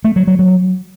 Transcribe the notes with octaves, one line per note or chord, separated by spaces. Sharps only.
A3
F#3
F#3
F#3